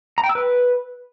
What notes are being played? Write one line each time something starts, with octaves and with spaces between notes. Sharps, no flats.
A#5
G5
E6
B4